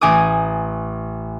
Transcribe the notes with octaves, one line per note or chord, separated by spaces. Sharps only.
A1 G#5 D6 D#6